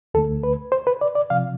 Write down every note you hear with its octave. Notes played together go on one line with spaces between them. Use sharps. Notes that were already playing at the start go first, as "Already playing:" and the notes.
D2 D3 A3 A4
B4
C5
B4
D5
D5
C3 F3 F5